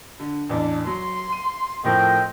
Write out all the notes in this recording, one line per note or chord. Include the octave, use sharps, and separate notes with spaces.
D3
A1 E2 D4
F#3 C6
D#7
A2 F3 A3 C4 A#4 D#5 G5